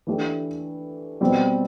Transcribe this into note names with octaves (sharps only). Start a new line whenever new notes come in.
E3 A3 D4 G4
B2 G3 C4